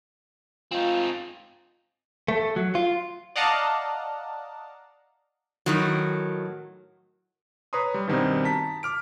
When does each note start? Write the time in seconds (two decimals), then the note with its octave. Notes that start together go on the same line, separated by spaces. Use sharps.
0.72 C4 D#4 F4
2.28 A3
2.56 F#3
2.75 F4
3.36 D5 D#5 F5 F#5 A5 A#5
5.66 A2 D#3 F#3
7.73 B4 C#5 A#5 C6 D#6
7.94 G3
8.07 G2 B2 D#3 G3 C4 D#4
8.44 A5 A#5 B6
8.83 D6 F6 D7